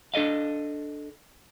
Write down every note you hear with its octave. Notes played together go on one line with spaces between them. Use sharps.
D4 A4 D#5 F5